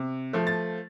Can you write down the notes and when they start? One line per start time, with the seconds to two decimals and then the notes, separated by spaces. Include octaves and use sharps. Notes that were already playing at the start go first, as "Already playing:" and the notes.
Already playing: C3
0.33 F3 A3
0.47 A6